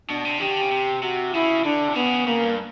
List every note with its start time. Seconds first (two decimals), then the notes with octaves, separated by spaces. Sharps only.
0.10 B2 D4
0.25 C3
0.40 D#3 G4
0.51 D3
0.61 C#3
0.71 C3
1.03 C3 F#4
1.34 C#3 E4
1.64 D3 D4
1.88 C3
1.95 C#3 B3
2.27 C#3 A#3
2.43 G2